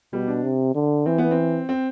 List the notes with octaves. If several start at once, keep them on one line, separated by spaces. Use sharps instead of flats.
B2 G3
D4
C3
D3
E3 C4
B3
C4
C4